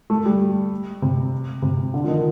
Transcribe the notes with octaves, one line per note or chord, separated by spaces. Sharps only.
A3
G3
C3
C3
D3
F3
D#3